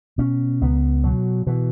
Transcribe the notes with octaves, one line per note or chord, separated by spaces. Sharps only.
B2 C#4
C#2 B3
B2 F#3
B2 E3